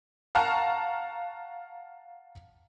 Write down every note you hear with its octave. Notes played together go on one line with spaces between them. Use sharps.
F5 F#5 A5 A#5 C#6 F6